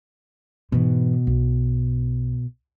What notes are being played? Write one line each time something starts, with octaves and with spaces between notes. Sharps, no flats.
G#2 B2 E3
B1